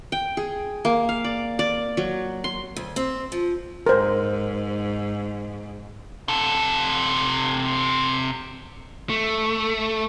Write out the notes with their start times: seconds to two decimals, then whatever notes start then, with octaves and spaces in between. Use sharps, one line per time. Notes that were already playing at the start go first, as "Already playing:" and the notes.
0.12 G5
0.37 G#4
0.85 A#3
1.09 F5
1.24 D5
1.59 D5
1.97 F#3
2.44 C6
2.76 D2
2.96 C4
3.32 F3
3.87 G#2 A#4 C5
6.28 C3 A4
9.10 A3